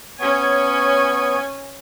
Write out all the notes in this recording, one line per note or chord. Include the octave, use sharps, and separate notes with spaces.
B3 C#4 C#5 G#5